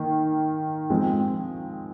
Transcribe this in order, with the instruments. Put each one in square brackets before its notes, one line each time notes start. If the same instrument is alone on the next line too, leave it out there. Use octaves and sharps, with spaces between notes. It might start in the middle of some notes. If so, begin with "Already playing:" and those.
Already playing: [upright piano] D#3 A#3
F3 G#3 C4